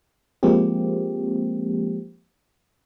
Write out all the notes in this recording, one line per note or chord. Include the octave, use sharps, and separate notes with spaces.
F3 G#3 A#3 C4 G4